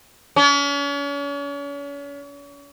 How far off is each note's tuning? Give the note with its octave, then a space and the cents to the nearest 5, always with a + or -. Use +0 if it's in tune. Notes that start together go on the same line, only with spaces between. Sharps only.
C#4 +40